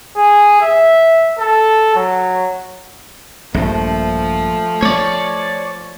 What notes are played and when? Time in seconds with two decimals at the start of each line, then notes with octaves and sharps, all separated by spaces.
0.16 G#4
0.61 E5
1.39 A4
1.95 F#3
3.54 A#1 G2 F3 A3
4.82 A3 C#5 D5 C#6